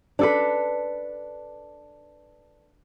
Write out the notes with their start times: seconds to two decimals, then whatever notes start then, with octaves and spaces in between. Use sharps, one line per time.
0.19 D4 A4 B4